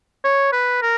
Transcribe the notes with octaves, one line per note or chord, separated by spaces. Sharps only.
C#5
B4
A#4